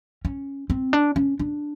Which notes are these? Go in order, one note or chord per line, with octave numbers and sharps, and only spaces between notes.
C#4
C4
D4
C#4
D4